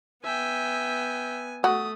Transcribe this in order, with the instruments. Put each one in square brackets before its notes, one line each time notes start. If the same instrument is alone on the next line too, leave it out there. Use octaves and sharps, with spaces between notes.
[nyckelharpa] B3 G#5 [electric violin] E5 G5
[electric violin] A3 D#6 [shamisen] F#4